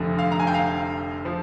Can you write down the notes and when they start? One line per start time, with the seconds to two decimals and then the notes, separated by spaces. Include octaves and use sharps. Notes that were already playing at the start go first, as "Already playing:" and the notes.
Already playing: F1 F2 D3
0.18 F5
0.32 A#5
0.40 G#5
0.47 G5
0.54 F5
1.25 F3